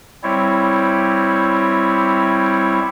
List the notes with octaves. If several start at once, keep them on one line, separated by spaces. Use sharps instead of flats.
G3 C4 E4 C#5